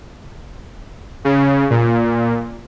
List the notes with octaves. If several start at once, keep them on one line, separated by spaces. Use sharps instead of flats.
C#3
A#2